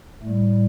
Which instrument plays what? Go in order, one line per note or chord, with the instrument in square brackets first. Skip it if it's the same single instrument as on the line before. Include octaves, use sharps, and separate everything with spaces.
[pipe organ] A2 G3 A3